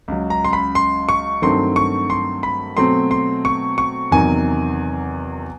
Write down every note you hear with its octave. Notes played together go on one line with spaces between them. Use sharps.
C#2 C#3 F#3
A#5
C6
B5
C6
C#6
G2 D#3 F#3 A3 C4 C6
C#6
C6
B5
B2 F#3 A3 C4 C6
C6
C#6
C#6
E2 C3 D#3 F#3 G#5